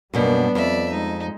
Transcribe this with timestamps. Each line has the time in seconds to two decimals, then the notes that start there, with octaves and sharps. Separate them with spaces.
0.14 F#2 B2 G3 A#3 B3 D4
0.55 F2 D5 E5
0.91 G#3 D#4